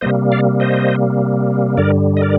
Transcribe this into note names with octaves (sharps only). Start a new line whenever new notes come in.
C3 G3 A#3 C5 D#5
D5 F5
C5 D#5
G2 D3 G3 A#4 D5
D#5
A#4 D5